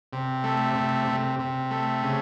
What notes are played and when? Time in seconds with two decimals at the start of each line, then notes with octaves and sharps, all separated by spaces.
0.13 C3
0.44 A3
0.75 C3
1.08 C3
1.39 C3
1.71 A3
2.03 C#3